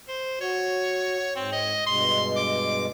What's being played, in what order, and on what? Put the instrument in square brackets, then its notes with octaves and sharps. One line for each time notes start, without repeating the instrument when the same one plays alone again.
[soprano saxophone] C5
[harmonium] F#4 [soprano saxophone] C#5
[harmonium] G#2 [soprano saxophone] C4
[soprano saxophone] D#5
[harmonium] G2 B2 G#3 [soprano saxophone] C6
[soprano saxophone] D6